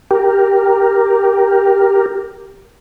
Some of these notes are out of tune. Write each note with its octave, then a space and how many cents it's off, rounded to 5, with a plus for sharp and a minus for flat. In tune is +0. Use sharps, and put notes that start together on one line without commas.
G4 +0 A#4 +0